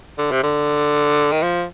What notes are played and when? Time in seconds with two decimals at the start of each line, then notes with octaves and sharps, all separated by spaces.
0.18 D3
0.31 C3
0.43 D3
1.32 D#3
1.42 F3